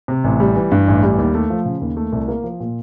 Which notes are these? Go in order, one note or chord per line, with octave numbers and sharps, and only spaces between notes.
C3
A1
G3
E3
G2
A1
G3
D#2
A3
F3
C#3
D#2
A3
C2
A#3
F3
A#2